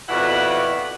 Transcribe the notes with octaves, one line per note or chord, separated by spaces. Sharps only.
F2 B2 E4 D5 F#5